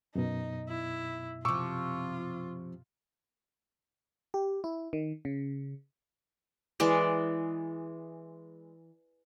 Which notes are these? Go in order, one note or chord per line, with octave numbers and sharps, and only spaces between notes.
F#2 B2 D#4
E4
C3 F3 F4 C#6 D6 E6
G4
E4
D#3
C#3
E3 G#3 D5